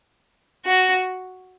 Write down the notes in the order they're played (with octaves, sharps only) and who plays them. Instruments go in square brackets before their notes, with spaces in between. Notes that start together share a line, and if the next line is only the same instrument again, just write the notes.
[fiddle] F#4